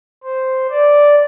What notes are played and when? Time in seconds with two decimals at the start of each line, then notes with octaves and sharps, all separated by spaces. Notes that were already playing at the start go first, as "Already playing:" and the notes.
0.23 C5
0.70 D5